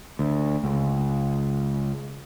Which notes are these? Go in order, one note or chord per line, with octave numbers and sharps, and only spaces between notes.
D2
C#2